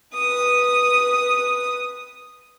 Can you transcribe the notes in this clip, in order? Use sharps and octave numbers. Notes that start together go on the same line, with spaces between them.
B4 D#6